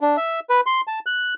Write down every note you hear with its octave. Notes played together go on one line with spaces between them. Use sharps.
D4
E5
B4
C6
A5
F#6